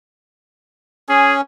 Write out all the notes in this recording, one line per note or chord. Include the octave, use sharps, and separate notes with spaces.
C#4 G#4